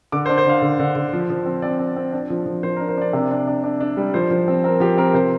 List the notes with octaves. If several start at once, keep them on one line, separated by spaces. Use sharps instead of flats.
D3 D6
C5
D4
C5
D3 F5
D3
D3
D3
F3
F3
C4
C4 D5
C4
C4
D4
F3
F3
F3 C5
A#4
D4
C5
D4 D5
C3
D4
D4
D4
D4
G3
F3 C5
F3
C4
C4 A#4
F3 G4
C4 A#4
C3 C5